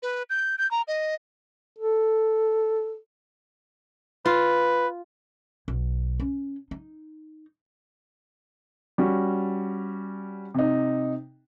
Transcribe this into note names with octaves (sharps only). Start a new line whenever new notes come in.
B4
G6
G6
A#5
D#5
A4
F4 B4
B1
C#4
D#4
G3 C#4 F#4
C3 D#4